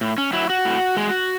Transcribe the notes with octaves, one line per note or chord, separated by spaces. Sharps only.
A2
C#4
F#3 E4
F#4
A2
G#3